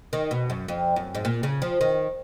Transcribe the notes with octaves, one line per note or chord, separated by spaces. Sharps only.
D#3
B2
F#2
F2
F#2
G#2
A#2
C#3
F3
D#3